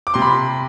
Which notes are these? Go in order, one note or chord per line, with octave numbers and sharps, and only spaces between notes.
D6
C3 C6
B5